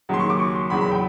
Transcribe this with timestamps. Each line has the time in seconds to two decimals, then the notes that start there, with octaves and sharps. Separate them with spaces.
0.09 D#2 C#3 F#3 C6
0.19 C#6
0.30 D6
0.40 C#6
0.55 C6
0.70 E2 C#3 F#3 B5
0.81 B5
0.91 G5